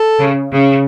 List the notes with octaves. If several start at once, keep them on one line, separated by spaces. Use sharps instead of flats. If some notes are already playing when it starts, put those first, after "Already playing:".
Already playing: A4
C#3
C#3